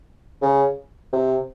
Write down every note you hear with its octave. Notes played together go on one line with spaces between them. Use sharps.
C#3
C3